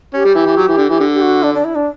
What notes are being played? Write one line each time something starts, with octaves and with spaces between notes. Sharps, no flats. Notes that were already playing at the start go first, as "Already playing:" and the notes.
C#4 G4
G3
E3
E3
F#3
E3
D3
E3
D3
G4
F#4
D4
D4
E4
D4